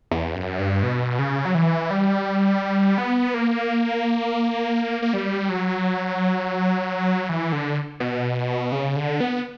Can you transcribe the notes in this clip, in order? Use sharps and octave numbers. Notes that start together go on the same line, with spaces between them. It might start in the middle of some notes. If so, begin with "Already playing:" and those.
E2
F#2
G2
B2
C#3
F#3
E3
G3
B3
A#3
A#3
G3
F#3
E3
D3
B2
C#3
D3
B3